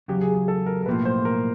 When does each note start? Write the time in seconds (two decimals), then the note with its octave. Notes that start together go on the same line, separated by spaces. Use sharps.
0.08 E2 C#3 F#3 G4
0.21 G#4
0.35 G#4
0.48 A4
0.66 A#4
0.82 A#4
0.86 B1 A2 F3 A#3 B4
1.05 C5
1.25 A#4